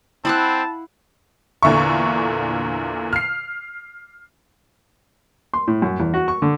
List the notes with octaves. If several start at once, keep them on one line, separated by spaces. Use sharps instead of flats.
C4 E4 F5 F#5 A5 B5 D#6 F#6
E2 A#2 D3 E5 C#6
F6 C7
C6
A2
F#2
E2
F#4
C#6
D3